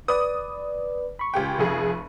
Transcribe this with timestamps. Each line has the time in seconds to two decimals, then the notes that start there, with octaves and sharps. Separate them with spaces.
0.08 B4 D5 D#6
1.19 B5 C#6
1.34 C#2 G4 G5
1.58 F1 F2 G#4